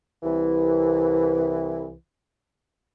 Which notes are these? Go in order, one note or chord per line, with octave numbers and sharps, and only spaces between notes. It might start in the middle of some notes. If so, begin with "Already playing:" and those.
C2 E3